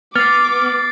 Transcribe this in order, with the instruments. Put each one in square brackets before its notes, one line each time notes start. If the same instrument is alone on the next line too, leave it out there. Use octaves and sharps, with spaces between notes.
[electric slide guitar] B3 [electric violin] D6 [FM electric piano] F6 [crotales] A6 C7